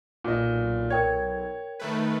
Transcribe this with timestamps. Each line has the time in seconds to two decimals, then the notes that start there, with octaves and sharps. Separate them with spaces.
0.24 B1 A#2 D#5
0.90 A#4 C#5 G5 G#6
1.80 D#3 A3 B4